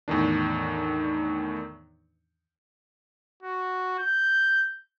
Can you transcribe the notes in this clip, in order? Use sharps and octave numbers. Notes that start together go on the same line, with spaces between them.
E2 A2 D#3 D4
F#4
G6